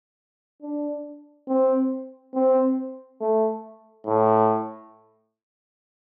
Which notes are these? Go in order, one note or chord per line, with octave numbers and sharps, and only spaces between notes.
D4
C4
C4
A3
A2